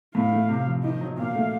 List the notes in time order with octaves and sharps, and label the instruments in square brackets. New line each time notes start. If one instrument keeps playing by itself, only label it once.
[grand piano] A2 [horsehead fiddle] F5
[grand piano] A3
C3
F3
[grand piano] D#3 [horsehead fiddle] D#5
[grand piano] F#3
[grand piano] A#2 [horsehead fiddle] F5
[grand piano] A3